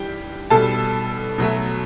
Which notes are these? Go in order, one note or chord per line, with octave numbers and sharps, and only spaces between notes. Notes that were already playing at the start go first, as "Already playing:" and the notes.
Already playing: G2 E3 G4 G5
B2 G3 A4 A5
B2 F#3 A3